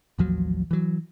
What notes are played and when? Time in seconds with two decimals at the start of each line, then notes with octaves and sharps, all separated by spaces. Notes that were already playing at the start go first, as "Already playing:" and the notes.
0.19 A1 D#2 F3 F#3
0.71 E3 F#3